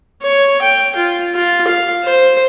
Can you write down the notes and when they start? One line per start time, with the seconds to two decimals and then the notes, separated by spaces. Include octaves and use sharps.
0.23 C#5
0.62 G5
0.96 F4
1.34 F4
1.68 F5
2.04 C5